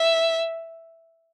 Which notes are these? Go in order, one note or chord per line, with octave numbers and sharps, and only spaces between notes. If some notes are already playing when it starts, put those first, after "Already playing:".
Already playing: E5